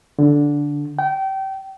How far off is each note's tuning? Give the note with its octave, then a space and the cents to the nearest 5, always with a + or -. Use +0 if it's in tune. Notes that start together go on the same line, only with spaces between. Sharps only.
D3 -10
G5 -25